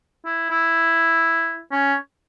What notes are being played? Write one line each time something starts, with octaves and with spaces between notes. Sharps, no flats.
E4
E4
C#4